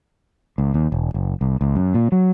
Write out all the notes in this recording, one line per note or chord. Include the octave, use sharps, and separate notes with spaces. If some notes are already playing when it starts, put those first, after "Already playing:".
C#2
D#2
E1
F#1
C2
C#2
F#2
A#2
F#3